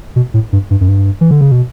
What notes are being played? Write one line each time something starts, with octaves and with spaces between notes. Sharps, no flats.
B2
A2
G2
G2
F#2
G2
E3
D3
C#3
B2